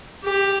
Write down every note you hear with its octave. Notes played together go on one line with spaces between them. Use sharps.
G4